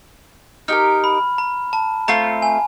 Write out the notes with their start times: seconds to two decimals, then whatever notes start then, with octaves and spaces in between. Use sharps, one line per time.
0.68 D#4 G4 A#4 F6
1.04 B5
1.38 A#5
1.73 A5
2.08 A3 C4 F4 A#5
2.42 G#5